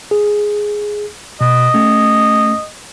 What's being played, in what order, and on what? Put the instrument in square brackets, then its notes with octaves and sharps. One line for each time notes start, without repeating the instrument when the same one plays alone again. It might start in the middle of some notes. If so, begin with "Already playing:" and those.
[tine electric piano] G#4
[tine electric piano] B2 [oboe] D#5
[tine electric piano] A3 C#4